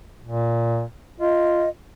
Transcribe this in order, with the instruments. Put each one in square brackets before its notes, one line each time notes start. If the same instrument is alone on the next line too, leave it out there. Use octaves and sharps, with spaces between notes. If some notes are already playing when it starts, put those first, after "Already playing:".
[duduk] A#2
[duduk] F4 [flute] D#5